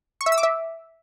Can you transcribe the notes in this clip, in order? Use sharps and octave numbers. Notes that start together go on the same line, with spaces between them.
C#6
E5
E6
D6
E5